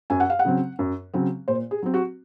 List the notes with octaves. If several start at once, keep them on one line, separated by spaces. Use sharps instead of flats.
F#2 G#5
F#5
F5
F#5
C#3 F#3 C4
F#2
C#3 F#3 C4
A#2 C5
G#4
F#3 C4
F#4